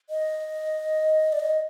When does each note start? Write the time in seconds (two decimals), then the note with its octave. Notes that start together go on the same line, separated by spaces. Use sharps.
0.10 D#5
1.32 D5
1.40 D#5